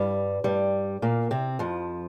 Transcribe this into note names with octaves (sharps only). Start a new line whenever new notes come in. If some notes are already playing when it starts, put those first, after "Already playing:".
Already playing: G2 G3
G2 G3
A#2 A#3
C3 C4
F2 F3